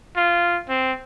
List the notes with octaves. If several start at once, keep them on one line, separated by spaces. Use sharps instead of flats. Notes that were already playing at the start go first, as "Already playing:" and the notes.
F4
C4